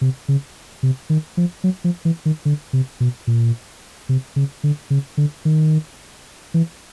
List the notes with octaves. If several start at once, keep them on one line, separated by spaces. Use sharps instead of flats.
C3
C#3
C3
D#3
F3
F#3
F3
E3
D#3
D3
C3
B2
A#2
C3
C#3
D3
C#3
D3
D#3
E3